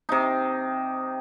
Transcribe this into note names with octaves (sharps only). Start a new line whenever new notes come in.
C3 D#4